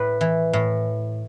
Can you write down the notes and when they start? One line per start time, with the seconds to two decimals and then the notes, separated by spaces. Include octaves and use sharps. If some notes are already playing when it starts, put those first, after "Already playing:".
Already playing: A2 B4
0.21 E3
0.53 A2